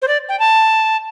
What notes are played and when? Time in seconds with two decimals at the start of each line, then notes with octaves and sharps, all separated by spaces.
0.02 C5
0.08 D5
0.29 G5
0.40 A5